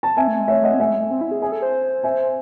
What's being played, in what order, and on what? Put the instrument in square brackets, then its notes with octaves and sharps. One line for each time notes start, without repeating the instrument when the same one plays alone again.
[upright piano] A5
[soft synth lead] C4 [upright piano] E5 G#5
[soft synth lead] A3
G#3
[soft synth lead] A3 [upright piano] C#5 E5
[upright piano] D#5 F#5
[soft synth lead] C4
[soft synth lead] A3 [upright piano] E5 G#5
[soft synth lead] G#3
A3
C4
E4
G#4
[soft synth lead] G#4 [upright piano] E5 G#5
[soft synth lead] A4
C5
[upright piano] E5 G#5